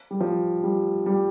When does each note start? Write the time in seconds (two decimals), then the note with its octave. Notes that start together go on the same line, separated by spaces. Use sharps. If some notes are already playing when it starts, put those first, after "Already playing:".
0.11 G3
0.20 F3
0.64 G3
1.06 G3